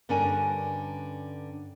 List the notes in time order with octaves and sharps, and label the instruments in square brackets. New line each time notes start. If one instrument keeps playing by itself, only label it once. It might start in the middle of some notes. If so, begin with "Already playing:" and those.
[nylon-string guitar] G2 D3 C#4 D4 A#4 G#5